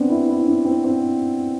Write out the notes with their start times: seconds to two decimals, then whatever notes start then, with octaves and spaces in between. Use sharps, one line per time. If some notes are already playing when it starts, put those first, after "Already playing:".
Already playing: B3 C4 D4
0.10 E4
0.28 E4
0.47 D4
0.65 C4
0.84 C4